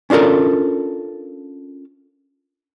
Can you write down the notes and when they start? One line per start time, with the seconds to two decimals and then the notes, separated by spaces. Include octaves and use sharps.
0.10 C#4 D4 F4 A4 A#4